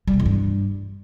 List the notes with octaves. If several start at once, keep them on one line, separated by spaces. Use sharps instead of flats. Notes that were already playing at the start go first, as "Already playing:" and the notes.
G3
C3
E2
G2